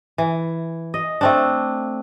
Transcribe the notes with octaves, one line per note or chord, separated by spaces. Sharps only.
E3
D#5
A3 C4 D4